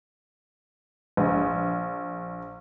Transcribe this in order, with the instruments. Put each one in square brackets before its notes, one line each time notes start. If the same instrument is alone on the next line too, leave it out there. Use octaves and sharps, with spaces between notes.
[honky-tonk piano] A#1